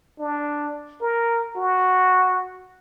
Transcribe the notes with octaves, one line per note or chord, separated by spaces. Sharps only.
D4
A#4
F#4